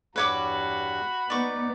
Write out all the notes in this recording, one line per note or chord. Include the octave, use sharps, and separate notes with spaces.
E2 G2 G3 F#4 B4 C#5 B5 D6
B3 D#4 D5 C#6